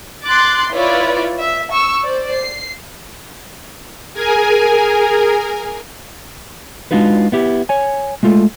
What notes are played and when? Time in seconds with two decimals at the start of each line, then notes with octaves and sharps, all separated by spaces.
0.25 C6 D6 F#6 A6
0.72 E4 F4 B4 C#5 D5
1.40 E5
1.73 C#6 E6
2.03 C5 D5
2.33 C7
4.14 G#4 A#4 G#5
6.91 G#3 D4 D#4 F4 F#4 B4
7.32 B3 E4 G4
7.69 C#5 G#5
8.23 G#3 A3 F4 A4